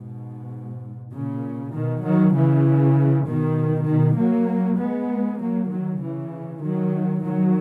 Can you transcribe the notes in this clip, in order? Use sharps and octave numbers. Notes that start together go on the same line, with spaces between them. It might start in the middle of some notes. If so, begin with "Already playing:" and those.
Already playing: G#2 B2
A#2 C#3
B2 D#3
D#3 F#3
C#3 E3
B2 D#3
B2 D#3
F#3 A#3
G#3 B3
F#3 A#3
D#3 F#3
C#3 E3
D#3 F#3
D#3 F#3